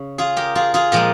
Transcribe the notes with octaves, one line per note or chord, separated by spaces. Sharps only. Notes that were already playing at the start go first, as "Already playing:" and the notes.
Already playing: C#3
F4 G#4
G4 A#4
F4 G#4
F4 G#4
A#2 F3 G#3 G4 A#4